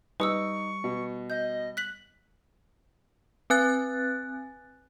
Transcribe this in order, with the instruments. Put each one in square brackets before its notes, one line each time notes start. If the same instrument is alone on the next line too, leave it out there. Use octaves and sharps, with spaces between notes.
[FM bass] G3 [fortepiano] D#4 [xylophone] B4 D#6 E6 [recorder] C#6
[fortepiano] B2
[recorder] D#5 [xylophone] G6
[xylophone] F#6 B6 F#7
[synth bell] C4 B4 G#5 F#6 A6